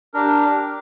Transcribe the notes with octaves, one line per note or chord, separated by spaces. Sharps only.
D4 G4 A#4